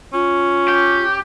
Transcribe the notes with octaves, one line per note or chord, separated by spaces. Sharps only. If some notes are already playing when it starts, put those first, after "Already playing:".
C#4 F4
G4